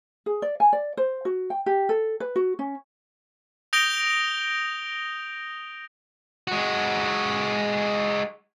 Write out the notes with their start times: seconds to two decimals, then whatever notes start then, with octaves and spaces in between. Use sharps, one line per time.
0.26 G#4
0.42 D5
0.60 G#5
0.73 D5
0.97 C5
1.25 F#4
1.50 G5
1.66 G4
1.89 A4
2.20 B4
2.36 F#4
2.59 C#4
3.73 D#6 G6 A#6 D7 F7 G7
6.48 G#3 F#4